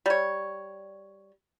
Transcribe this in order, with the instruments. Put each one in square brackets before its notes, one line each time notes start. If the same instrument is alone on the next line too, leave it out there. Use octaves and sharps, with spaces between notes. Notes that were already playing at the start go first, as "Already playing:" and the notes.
[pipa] G3 C#5